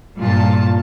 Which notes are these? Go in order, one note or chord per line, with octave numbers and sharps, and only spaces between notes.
G2 A#2 F4 A5